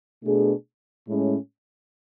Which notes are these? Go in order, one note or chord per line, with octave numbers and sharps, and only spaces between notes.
B2 A3 D4 G#4
A2 G#3 C#4